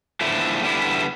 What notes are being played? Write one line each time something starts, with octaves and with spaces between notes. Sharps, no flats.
E2 D3 F3 A3 E4
E2 D3 G3 B3 E4